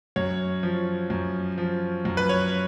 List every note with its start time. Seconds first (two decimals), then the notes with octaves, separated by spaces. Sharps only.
0.16 F#2 C#5
0.63 F3
1.10 F#2
1.58 F3
2.05 F#2
2.17 B4
2.29 C#5